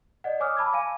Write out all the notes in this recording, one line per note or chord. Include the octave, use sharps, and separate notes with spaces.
D5 D#5 F#5
C#5 G#5 D6 D#6 F6
A5 B5 D6 E6 G#6
F5 G#5 D#7